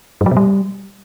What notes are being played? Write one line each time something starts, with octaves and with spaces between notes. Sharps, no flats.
G2
F#3
B2
G3